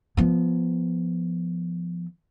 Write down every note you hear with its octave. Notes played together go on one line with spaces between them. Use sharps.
F3 B3